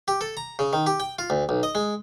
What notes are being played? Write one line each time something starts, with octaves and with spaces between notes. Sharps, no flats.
G4
A4
A#5
C#3
D#3
G4
G5
F4
D2
B1
D#5
G#3